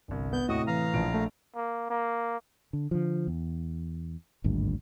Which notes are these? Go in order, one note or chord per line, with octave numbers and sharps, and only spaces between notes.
G1 C2
B3 G6
D#2 A2 C3 F#4 D#5 D#6
E3 F5 A#5
A#1 F3 D7
A3
A#3
A#3
D3
D3 F3
E2
G#1 D2 G2 A#2